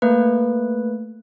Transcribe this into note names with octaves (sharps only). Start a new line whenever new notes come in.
A3 A#3 B4